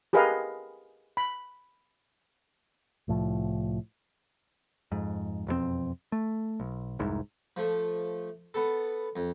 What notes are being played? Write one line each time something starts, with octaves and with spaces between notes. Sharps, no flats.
G4 G#4 A#4 B4 D#5 F5
B5
C2 A2 F3
F2 G#2
E1 F2 F#3 C4
A3
B1
F1 C2 G#2
F3 A3
B3 A4
F2